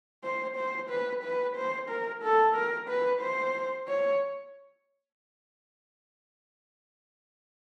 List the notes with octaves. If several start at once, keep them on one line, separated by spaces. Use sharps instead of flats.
C5
C5
B4
B4
C5
A#4
A4
A#4
B4
C5
C#5